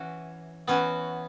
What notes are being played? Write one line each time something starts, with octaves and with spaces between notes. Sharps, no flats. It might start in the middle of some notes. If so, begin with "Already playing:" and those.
Already playing: E3 C#4 F#4
E3 B3 C#4 F#4